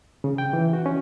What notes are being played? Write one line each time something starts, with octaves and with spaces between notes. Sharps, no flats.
C#3
G5
E3
F#4
C#4